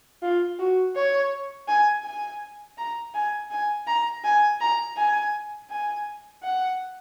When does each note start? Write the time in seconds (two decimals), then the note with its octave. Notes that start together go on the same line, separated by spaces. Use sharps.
0.22 F4
0.59 F#4
0.96 C#5
1.68 G#5
2.04 G#5
2.78 A#5
3.15 G#5
3.51 G#5
3.88 A#5
4.24 G#5
4.61 A#5
4.97 G#5
5.70 G#5
6.43 F#5